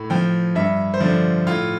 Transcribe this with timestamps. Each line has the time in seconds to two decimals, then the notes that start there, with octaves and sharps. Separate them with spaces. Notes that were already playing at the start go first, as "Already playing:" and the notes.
Already playing: A2
0.10 F3 G5
0.55 G2 E5
0.94 C5
1.00 D3 F3 D5
1.47 A2 F4